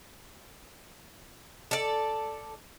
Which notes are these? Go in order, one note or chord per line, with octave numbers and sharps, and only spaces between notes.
A4 D5